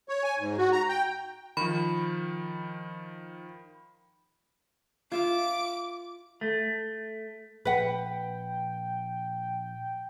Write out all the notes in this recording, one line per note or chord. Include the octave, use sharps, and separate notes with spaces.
C#5
G#5
G#2
F#4
A#5
G5
D#3 F3 B5
F4 E5 F5 D6
A3
A#1 B4 F#5 G5